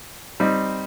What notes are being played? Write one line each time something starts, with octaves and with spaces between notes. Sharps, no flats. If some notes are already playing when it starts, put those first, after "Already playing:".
G3 C4 D#4